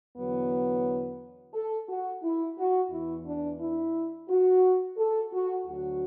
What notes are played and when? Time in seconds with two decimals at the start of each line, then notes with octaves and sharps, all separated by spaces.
0.17 E2 D3 F#3 B3
1.54 A4
1.89 F#4
2.23 E4
2.58 F#4
2.91 E2 E3 E4
3.26 D4
3.60 E4
4.29 F#4
4.97 A4
5.33 F#4
5.66 D2 D3 F#3 F#4